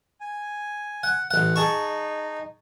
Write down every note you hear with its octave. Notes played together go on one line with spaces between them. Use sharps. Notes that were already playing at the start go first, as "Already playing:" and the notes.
G#5
F#5
A1 F#5
D#4 G#4 A5 C#6